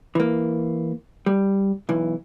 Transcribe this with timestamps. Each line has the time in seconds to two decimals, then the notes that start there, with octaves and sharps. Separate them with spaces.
0.15 E3 A#3
1.26 G3
1.89 B1 E3